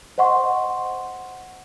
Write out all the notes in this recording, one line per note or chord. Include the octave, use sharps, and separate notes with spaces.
C5 D#5 F#5 C6 C#6